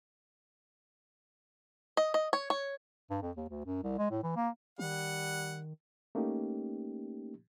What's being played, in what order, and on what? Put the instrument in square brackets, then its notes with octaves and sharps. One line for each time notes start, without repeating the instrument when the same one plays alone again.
[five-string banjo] D#5
D#5
C#5
C#5
[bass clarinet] G2
F2
D#2
D2
F#2
C2
G#3
A2
E3
A#3
[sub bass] D#3 [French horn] G3 [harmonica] F#5
[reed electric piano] A3 A#3 C#4 D#4 G4